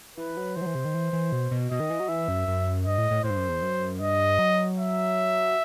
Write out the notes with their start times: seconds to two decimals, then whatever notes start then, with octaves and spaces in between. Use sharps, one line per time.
0.17 E3 B4
0.37 F#3
0.55 E3 C5
0.62 F#3
0.66 E3
0.75 C3
0.85 D#3
0.94 E3
1.13 E3
1.32 B2
1.51 B2
1.71 B2 D#5
1.80 D#3
1.90 E3
2.00 F#3
2.08 E3 E5
2.28 F#2
2.48 F#2
2.86 G2 D#5
2.98 A2
3.11 A2
3.24 A2 C5
3.30 G2
3.37 F#2
3.49 E2
3.62 F#2
4.00 G2 D#5
4.39 F#3
4.77 E5